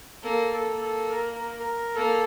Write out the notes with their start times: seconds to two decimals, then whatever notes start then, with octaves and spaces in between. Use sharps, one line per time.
0.23 A#3 A4
0.53 A4
0.66 A#3
0.81 A4
1.10 A#4
1.34 A#4
1.60 A#4
1.95 A#3 A4